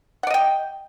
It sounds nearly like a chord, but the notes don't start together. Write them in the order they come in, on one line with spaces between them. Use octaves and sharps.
F#5 D5 D#5 G5